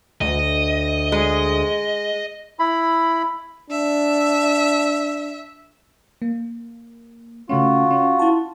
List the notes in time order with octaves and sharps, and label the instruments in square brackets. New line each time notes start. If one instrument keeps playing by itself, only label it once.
[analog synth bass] D2 [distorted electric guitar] D#5
[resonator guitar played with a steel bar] G#3
[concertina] E4 B5
[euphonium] D4 [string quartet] E5
[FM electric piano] A#3
[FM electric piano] C#3 A3 C#4 [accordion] F4 F#4
[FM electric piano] C#4
E4 A5